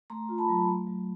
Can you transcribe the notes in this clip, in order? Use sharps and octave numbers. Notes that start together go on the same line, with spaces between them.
A3 A#5 C6
F4
A5 B5
F#3
A3
F#3